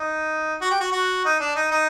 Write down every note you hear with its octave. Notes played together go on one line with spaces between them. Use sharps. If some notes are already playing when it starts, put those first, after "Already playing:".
Already playing: D#4
F#4
G4
F#4
F#4
D#4
D4
D#4
D#4